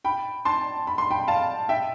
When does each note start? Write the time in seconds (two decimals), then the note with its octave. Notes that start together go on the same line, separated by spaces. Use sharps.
0.05 G5 B5
0.45 A5 C6
0.87 B5
0.98 C6
1.11 G5 B5
1.28 F5 A5
1.69 E5 G5